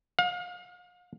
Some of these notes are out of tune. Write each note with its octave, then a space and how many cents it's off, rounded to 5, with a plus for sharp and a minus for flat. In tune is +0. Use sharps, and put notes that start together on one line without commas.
F5 +35